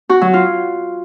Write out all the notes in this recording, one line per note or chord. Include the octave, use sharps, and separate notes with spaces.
F#4
F#3
F4